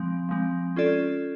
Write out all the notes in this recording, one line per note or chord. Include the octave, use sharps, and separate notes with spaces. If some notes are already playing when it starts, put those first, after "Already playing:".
Already playing: F3 G#3 C4
F3 G#3 C4
C#4 F4 A4 D5